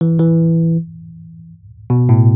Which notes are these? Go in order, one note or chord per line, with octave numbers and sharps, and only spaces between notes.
E3
E3
B2
A2